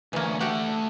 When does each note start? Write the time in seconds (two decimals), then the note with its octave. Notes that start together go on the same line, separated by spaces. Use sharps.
0.13 D2 E3 A#3 C#4
0.41 A3 F#4 G4 F#5 G5